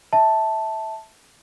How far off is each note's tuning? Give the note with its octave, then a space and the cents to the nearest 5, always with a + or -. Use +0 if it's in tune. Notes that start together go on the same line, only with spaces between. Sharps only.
E5 -20 A5 +0